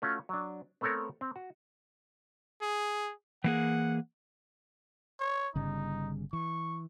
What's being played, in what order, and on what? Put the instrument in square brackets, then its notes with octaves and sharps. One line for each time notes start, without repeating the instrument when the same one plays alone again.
[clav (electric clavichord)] A3 C#4 F4 F#4
F#3 D4
A3 B3 C4 A4 A#4 C#5
C4
F#4
[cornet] G#4
[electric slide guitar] E3 A#3 G#4 [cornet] F#5
[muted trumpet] C#5
[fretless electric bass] G1 C#3 G3 [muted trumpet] D#4
[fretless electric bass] E3 [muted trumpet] C#6